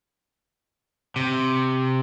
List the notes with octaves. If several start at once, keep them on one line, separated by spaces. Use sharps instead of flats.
C3